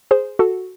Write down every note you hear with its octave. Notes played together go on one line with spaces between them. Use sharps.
G#4 C5
F#4 A4